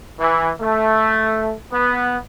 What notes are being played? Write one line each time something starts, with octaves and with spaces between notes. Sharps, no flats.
E3
A3
B3